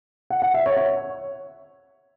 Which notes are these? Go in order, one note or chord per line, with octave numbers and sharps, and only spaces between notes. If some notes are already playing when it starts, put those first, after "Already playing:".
F#5
F#5
E5
C#5
C#5